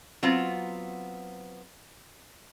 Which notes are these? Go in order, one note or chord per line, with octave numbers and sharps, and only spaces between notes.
F#3 B3 C4 F4